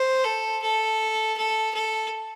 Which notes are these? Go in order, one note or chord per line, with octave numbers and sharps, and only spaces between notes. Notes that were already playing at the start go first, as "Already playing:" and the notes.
Already playing: C5
A4
A4
A4
A4